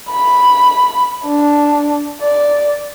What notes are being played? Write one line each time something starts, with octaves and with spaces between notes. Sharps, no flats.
B5
D4
D5